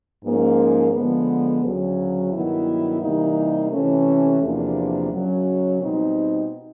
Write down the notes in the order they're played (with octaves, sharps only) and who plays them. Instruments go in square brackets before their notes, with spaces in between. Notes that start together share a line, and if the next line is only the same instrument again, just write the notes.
[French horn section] G#2 F3 A#3 C#4
D3 F3 G#3 B3
D2 C#3 F#3
G2 D#3 F#3 B3 E4
C3 E3 G3 A#3 D#4
C3 E3 A3 C#4
E2 C3 F3 A#3 D4
F#2 C#3 F#3
B2 G3 C4 D#4